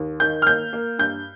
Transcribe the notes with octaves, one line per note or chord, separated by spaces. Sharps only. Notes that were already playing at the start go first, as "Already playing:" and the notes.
Already playing: D#2
D#3 G6
F6
A#3 G6
A#3
G2 G6